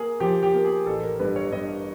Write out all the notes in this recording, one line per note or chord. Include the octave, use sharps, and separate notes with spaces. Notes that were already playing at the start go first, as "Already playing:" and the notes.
Already playing: A#3 G#4
F3 G4
G4
A#3
G#4
A1 A4
A#4
G2 B4
C#5
G2 D#5